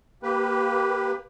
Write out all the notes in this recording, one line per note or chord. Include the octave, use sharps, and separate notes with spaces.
A#3 G4 B4